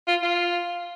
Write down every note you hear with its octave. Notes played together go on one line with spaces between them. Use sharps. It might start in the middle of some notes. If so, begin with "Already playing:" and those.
F4
F4